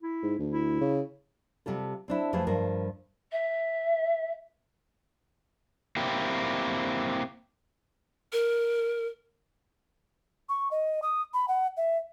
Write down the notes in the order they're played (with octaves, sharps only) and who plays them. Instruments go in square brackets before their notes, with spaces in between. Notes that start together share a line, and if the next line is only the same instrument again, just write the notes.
[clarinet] E4
[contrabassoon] G#2
D2
[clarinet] E4
[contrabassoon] C#3
[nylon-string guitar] C3 G3 F4 A4
C4 D4 E4
F2 F3 A3 E4 G#4 B4
G2 F3 A#4
[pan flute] E5
[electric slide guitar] A#3 C4 E4 G4
[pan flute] A#4
[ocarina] C#6
D#5
D#6
B5
F#5
E5